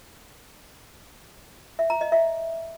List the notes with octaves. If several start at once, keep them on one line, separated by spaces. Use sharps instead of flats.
E5
A#5
D#5
E5